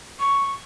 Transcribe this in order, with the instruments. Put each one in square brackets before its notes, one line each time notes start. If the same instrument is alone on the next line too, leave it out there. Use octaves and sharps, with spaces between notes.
[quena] C#6